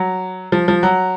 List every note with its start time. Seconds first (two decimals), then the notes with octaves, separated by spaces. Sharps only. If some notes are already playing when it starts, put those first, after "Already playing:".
Already playing: F#3
0.52 F3
0.68 F3
0.83 F#3